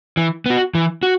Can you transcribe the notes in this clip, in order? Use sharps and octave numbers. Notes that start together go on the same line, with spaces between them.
E3
B3 F#4
E3
F#4